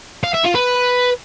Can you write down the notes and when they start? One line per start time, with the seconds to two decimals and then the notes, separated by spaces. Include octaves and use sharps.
0.24 F5
0.34 E5
0.44 F4
0.55 B4